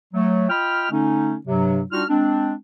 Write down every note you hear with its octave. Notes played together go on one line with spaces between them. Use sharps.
F#3 A3
F4 D#5 G5 B5 F6
D3 A3 C#4 D#4
G2 C3 F#3
G3 D4 D#4 F4 F#4 F6
G#3 C4 D4